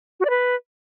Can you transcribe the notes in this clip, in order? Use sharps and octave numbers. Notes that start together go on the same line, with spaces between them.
F#4
D5
B4